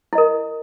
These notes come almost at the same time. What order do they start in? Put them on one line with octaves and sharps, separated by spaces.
E4 D#5 A#4